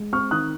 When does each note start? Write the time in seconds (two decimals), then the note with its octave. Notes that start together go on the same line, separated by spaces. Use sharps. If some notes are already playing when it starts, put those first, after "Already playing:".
Already playing: G#3
0.12 C4 C#6 F6
0.31 D#3 D#6 F#6